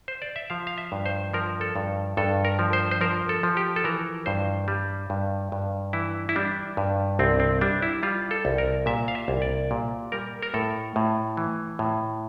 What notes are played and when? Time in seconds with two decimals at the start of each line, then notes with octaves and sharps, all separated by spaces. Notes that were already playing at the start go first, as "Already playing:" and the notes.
0.08 C5
0.22 D5
0.36 E5
0.50 F3 F5
0.67 F5
0.78 E5
0.92 G2
1.06 C5
1.34 F3 A#4
1.61 A4
1.76 G2
2.17 G2 A4
2.45 A#4
2.59 F3
2.73 C5
2.91 C5
3.01 F3 A#4
3.29 A4
3.43 F3
3.57 G4
3.76 A4
3.84 E3 A#4
4.26 G2 C5
4.68 G3
5.10 G2
5.52 G2
5.93 E3 E4
6.29 E4
6.36 G3 D4
6.77 G2
7.19 C2 C4
7.40 C4
7.61 G3 D4
7.82 E4
8.03 G3 F4
8.31 A4
8.45 C2
8.58 A#4
8.86 A#2 E5
9.08 F5
9.15 E5
9.28 C2
9.42 D5
9.71 A#2
10.12 G3 A#4
10.43 A#4
10.54 A2 A4
10.96 A2
11.37 E3
11.79 A2